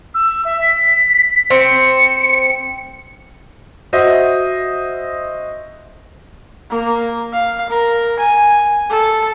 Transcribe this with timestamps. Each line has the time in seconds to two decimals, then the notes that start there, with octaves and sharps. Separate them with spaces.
0.14 E6
0.45 E5
0.61 B6
1.50 C4 C#7
3.93 F#4 C5 D#5 E5
6.70 A#3
7.33 F5
7.70 A#4
8.19 G#5
8.90 A4